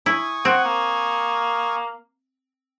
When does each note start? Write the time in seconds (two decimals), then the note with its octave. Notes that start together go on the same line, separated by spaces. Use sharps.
0.06 E4 G#5 C#6 D#6
0.45 C4 F#5
0.65 A#3